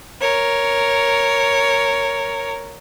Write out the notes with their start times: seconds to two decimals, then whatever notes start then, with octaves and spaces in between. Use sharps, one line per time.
0.21 A#4 C#5